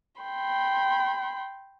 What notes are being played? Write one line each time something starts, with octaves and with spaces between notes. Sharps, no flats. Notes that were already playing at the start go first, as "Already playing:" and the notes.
G5 B5 C6